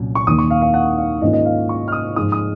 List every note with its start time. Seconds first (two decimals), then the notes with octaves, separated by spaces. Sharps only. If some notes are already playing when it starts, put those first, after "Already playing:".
Already playing: C2 A#2 F#3 C#4
0.15 C#6
0.27 D#2 D#3 A#3 D#6
0.39 C#6
0.50 F5
0.62 F5
0.74 F#5
0.98 F5
1.21 G#2 D#3 A#3 C#4 F4 D#5
1.33 D#5
1.45 F5
1.69 C#6
1.88 F6
1.92 D#6
2.16 G#2 F3 G#3 D#4 D#6
2.32 D#6